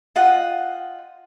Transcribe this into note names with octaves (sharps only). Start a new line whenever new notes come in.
F4 D#5 F#5 G5